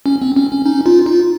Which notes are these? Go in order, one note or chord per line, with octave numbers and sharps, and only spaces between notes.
C#4
C4
C#4
C#4
C#4 D#4
D#4 F4
D#4 F4